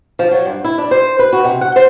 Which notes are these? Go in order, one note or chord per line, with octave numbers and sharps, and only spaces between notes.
F3
F#3
G2
E4
D4
C5
B4
F#4
C3
F#5
C5